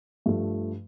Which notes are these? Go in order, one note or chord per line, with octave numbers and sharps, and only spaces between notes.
G2 F3 A3